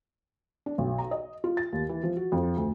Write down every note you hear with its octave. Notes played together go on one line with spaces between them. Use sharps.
D4
B1
A#5
D#5
F4
A6
D#2
E3
F3
F#4
F2
D2